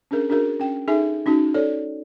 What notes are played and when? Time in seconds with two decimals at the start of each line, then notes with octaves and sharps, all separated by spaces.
0.11 C#4 D4 G#4 A#4
0.30 D4 F#4 G#4 A#4
0.60 C#4 G5
0.88 D#4 G#4 A4 E5 G#5
1.26 C#4 D#4 F#4 A5
1.54 A4 C#5 D5